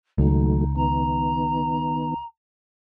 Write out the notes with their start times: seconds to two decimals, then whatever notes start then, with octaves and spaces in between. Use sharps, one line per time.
0.18 C#2 D#3 F#3 A3 D#4
0.76 D#3 B3 A#5